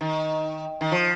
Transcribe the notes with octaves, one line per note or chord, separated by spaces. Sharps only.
D#3
D#3
F3